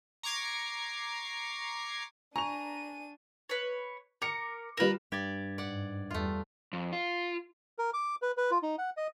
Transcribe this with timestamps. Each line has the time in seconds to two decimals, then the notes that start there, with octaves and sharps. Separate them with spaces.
0.23 A#5 C#6 D6 G#6 C7
2.36 D4 G#5 A#5 C#6 D#7 F7
3.49 B4 C#5
4.22 A#4 D6 C#7
4.77 G3 F4 A#4 B4 E7
5.12 G2 G4 D5 G#6 A6
5.58 G#2 D5 F#5
6.11 E2 G3 A3 F4
6.73 F2
6.93 F4
7.78 A#4
7.94 D6
8.22 B4
8.37 B4
8.51 F4
8.63 D#4
8.78 F#5
8.97 D#5